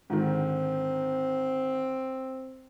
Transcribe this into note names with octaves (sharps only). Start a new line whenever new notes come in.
G#2 D3 D#3 C4